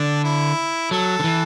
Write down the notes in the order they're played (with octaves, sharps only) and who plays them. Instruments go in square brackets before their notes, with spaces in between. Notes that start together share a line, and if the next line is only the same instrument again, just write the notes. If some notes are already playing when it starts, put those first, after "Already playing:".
Already playing: [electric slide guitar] D3 [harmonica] D4
[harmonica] E4
[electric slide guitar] F#3 [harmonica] A4
[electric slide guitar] D3
E3